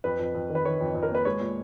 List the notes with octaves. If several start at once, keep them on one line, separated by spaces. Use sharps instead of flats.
F2 B4
F2
F2
D#3
B4
D#3 C#5
F2
F2
A#4
A#3 B4
G#3 C#5
A#2